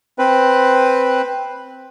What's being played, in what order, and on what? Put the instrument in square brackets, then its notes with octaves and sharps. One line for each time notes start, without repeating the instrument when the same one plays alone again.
[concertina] C4 B4